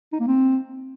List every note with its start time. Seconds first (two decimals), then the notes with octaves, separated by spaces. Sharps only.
0.13 D#4
0.20 A#3
0.27 C4